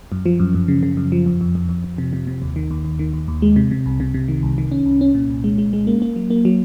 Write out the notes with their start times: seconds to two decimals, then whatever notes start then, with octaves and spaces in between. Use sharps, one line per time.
0.12 F#2
0.26 F3
0.40 F#2
0.54 F#2
0.68 C#3
0.83 C#3
0.97 F#2
1.12 F3
1.26 F2
1.41 F2
1.55 F2
1.69 F2
1.84 F2
1.98 C3
2.13 C3
2.27 C3
2.42 D#2
2.56 D#3
2.71 D#2
2.85 D#2
2.99 D#3
3.13 D#2
3.28 D#2
3.42 G#3
3.56 C3
3.71 C3
3.86 C2
4.00 C3
4.14 C3
4.28 D#3
4.43 C2
4.58 D#3
4.72 C#4
4.86 C2
5.01 C#4
5.15 A#2
5.30 C2
5.44 G#3
5.58 G#3
5.73 G#3
5.87 A#3
6.02 A#3
6.16 F#3
6.30 A#3
6.45 F#3